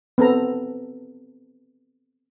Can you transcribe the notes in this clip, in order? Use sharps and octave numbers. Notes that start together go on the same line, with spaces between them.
B3 C4 A4 A#5